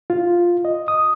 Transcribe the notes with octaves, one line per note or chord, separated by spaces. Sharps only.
F4
D#5
D#6